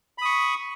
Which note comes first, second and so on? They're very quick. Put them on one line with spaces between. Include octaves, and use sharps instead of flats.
B5 D#6 C#6